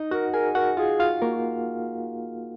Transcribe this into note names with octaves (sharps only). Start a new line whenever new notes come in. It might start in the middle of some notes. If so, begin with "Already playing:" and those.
Already playing: D#4 D#5
F#4 A#4 F#5
G#4 A#4 G#5
F#4 A#4 F#5
F4 G#4 F5
F4 F5
A#3 F#4 A#4